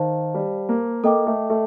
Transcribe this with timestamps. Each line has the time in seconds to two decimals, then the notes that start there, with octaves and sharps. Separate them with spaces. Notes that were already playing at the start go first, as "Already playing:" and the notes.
Already playing: D#3 C5 F5 A5
0.34 G3
0.69 A#3
1.04 A#3 A4 D#5 G5 D6
1.27 A3
1.50 A3